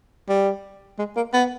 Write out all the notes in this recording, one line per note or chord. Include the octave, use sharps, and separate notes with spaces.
G3
G#3
A#3
B3